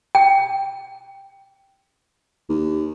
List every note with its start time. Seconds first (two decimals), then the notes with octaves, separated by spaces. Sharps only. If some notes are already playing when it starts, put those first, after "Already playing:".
0.15 G5
2.49 D#2